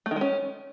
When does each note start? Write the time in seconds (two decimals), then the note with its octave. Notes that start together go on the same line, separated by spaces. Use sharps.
0.06 A3
0.11 D#3
0.16 G#3
0.21 C#4